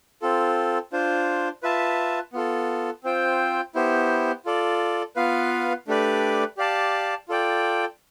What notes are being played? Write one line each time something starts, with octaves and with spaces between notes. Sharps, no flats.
C4 F4 A4
D4 F4 C5
F4 B4 E5 A5
B3 F4 A4
C4 F4 C5 G5
B3 E4 G4 C5
F4 A4 D5
B3 F4 B4 F5
A3 D4 G4 B4 D5
G4 D5 F5 A5
F4 A4 D5 G5